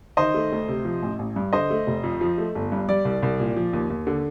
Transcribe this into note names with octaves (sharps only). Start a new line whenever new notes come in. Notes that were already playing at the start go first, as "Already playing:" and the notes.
D#3 C5 D#5
A3
D2
C3
F3
A1
A1
G2
D3 C5 D#5
A3
F1
F2
F3
A3
G1
G2
G3 D5
C2
C2
A#2
F3
D#2
D#2
D3